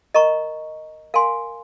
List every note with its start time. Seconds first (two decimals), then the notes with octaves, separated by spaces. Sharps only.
0.14 A#4 D#5 A#5 C#6
1.14 A#4 F5 G#5 C6